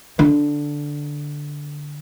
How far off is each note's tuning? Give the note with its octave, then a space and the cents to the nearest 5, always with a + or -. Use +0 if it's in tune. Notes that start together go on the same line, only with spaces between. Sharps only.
D3 +0 D4 +0